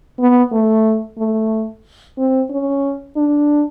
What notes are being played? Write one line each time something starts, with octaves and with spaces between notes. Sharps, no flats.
B3
A3
A3
C4
C#4
D4